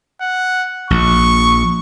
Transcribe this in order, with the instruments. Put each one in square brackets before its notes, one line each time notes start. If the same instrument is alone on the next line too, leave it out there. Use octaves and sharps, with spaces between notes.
[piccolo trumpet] F#5
[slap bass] A#1 [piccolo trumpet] C#6